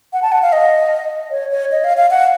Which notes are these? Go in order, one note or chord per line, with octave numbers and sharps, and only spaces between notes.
F#5
A5
F#5
F5
D#5
C#5
C#5
D#5
F5
F5
F#5